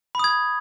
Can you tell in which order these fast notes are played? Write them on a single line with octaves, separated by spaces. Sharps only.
B5 D#6 G#6